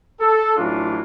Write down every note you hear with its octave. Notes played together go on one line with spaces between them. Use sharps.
A4
A1 E3 F#3 D4 F4